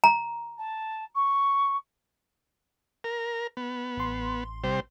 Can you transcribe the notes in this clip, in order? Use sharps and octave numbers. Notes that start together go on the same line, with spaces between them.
A#5
A5
C#6
A#4
B3
A1 C6
C3 G3 C5